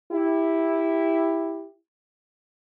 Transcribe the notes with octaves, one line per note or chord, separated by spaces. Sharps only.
E4 G4